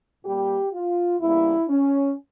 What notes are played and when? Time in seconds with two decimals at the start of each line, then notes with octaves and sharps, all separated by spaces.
0.24 A#2 G3 A#3 G4
0.72 F4
1.20 E2 C#3 G3 A#3 E4
1.69 C#4